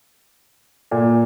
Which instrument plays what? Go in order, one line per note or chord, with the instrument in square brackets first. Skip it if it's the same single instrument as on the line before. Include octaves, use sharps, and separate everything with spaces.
[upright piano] A#2